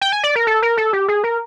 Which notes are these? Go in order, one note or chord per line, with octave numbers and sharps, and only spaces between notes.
G5
G#5
D5
A#4
A4
A#4
A4
G4
G#4
A#4